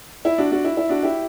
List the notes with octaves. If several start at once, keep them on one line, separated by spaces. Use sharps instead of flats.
E4
D4 F#4
D4 F#4
E4
E4
D4 F#4
E4 G4